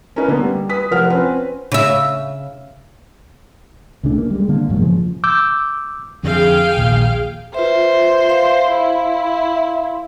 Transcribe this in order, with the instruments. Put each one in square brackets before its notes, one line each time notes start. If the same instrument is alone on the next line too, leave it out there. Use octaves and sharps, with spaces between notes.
[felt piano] C#4 D#4 A#4 B4
D3 A#3 B3
G3
B4 D#6 B6
F1 F3 A#4 F#5 F6
C4 C#4 B4
[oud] C#3 E5
[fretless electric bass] C#2 C#3 A3 D4
A#3
G3 G#3
D3 A#3
E1 G#2 F#3 A#3
C#3 F3
[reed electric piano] D6 E6 G6
[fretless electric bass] F2 D3 [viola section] G#4 F5 G5
[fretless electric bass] A#1 D#2 A#2
[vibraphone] F4 B4 E5 [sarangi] C5
[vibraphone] E5 F5 C6
[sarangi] E4